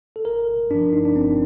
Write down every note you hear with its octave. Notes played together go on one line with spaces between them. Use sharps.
A4
G1 A#4
G2 F3 D4
D#4
D4
G1 C4